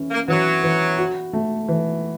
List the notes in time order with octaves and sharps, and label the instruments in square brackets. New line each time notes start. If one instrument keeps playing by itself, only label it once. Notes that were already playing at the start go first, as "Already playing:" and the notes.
Already playing: [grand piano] E3 C#4
[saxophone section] A#3
[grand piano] E3 [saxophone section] F#3
[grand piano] E3
F#4
A3
E3